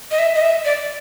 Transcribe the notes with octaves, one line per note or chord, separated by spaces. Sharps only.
D#5
E5
D#5
E5
D5